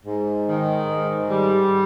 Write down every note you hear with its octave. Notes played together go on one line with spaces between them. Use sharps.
G#2
D#3
G#2
G3